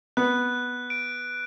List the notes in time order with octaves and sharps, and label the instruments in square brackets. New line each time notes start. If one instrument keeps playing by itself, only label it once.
[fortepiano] B3 [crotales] F#6
[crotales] D7